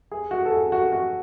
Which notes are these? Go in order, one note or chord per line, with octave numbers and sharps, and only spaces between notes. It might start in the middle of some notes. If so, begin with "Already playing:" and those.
G#4
F#4
A4
G#4
F#4
F#4